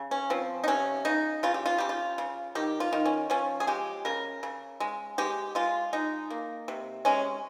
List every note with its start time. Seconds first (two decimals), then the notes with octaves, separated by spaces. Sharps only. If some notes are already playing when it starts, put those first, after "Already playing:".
Already playing: C#3
0.11 C#4
0.30 F3 C4
0.64 D#4
0.68 C3 C#4
1.05 C#3 D#4
1.43 C#3 F4
1.54 G4
1.66 F4
1.78 C#3 G4
1.89 F4
2.18 C#3
2.55 D#3 G4
2.80 F4
2.93 D#3
3.05 C#4
3.30 F3 C#4
3.60 G#4
3.67 G#3 G4
4.05 C#3 A#4
4.43 C#3
4.80 G#3
5.18 G#3 G4
5.55 G#3 F4
5.93 G#3 D#4
6.30 A#3
6.68 C3
7.05 G#3 C#4